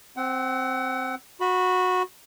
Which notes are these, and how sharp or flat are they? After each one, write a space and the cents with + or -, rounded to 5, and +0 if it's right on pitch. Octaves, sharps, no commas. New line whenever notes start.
C4 +0 F#5 +30
F#4 -15 B5 +0